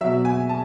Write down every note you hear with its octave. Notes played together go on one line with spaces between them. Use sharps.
B2 F#3 E5
G#5
A5